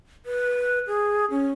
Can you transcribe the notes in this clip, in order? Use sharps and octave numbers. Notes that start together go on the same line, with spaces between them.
B4
G#4
C#4